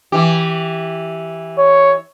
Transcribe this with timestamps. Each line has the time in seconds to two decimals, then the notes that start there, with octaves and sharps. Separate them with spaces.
0.12 E3 G4
1.58 C#5